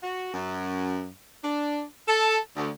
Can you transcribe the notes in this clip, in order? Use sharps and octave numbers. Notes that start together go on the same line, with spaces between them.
F#4
F#2
D4
A4
D2